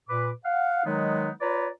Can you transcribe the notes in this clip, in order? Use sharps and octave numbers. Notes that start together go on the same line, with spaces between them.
A#2 B4 D6
F5 F#5
D#3 F#3 G#3 B3 D#4
F4 B4 C#5 D5 A#5 B5